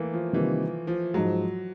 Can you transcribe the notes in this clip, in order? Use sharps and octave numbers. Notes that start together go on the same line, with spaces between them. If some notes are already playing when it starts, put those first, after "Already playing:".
Already playing: E3 A3 A#3
F3
C3 D#3 E3 G3 A#3
F3
G#2 F3 F#3 G#3